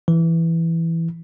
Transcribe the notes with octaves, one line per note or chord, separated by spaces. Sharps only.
E3